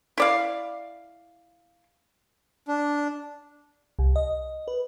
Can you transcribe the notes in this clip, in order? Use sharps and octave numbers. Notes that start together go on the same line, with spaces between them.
E4 D5 F5
D4
C2
D#5
B4